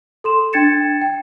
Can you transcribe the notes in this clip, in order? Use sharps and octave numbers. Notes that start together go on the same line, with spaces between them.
A4 C6 E7
D4 G5 G#6 A6 C#7 E7
G5